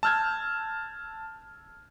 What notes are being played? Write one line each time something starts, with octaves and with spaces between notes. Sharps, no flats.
A5 E6 F6 G6 G#6